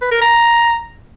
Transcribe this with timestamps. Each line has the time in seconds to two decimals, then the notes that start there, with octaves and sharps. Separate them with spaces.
0.01 B4
0.11 A#4
0.21 A#5